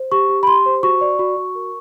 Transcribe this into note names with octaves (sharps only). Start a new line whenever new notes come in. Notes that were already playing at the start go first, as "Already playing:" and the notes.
Already playing: C5
G4 C#6
G4
B5
G4 C6
C5
F#4 C#6
D5
F#4
F#4
A#4